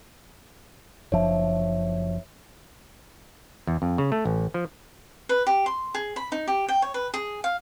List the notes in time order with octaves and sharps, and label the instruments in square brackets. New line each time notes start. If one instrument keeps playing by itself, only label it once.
[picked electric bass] F#1 F3 D4 [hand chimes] C#5 E5
[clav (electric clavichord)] E2
F2
C#3
A3
A1
F3
[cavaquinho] B4
G4
C6
G#4
B5
D#4
G4
G5
C#5
B4
G#4
F5